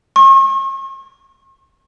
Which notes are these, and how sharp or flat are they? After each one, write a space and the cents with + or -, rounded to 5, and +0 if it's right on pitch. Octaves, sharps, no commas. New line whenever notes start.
C#6 -45